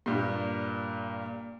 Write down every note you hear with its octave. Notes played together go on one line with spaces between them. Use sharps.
G2 A#2